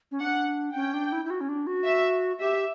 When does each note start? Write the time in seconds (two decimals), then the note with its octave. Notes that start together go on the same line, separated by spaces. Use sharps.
0.11 C#4
0.20 D4 F#5
0.75 C#4 G5
0.94 D4
1.12 E4
1.25 E4
1.30 F#4
1.41 C#4
1.49 D4
1.67 F#4
1.85 E5
2.40 G4 E5